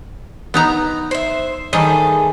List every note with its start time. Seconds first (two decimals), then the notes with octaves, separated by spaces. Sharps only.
0.54 B3 D#4 A#5
1.11 C5 E5
1.73 A2 D#3 G3 G#4 A4 D#5